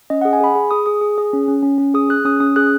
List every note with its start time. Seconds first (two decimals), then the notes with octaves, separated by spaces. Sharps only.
0.10 C#4 D#5
0.21 F#5
0.25 G#4
0.33 G#5
0.40 G#4 B5
0.55 G#4
0.71 G#4 D#6
0.86 G#4 D#6
1.01 G#4
1.18 G#4
1.33 C#4
1.48 C#4
1.63 C#4
1.78 C#4
1.94 G#4 D#6
2.09 G#4 F#6
2.25 C#4 D#6
2.40 C#4 D#6
2.56 G#4 F#6